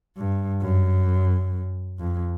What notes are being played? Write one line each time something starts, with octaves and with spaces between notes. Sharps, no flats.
G2
F#2
F2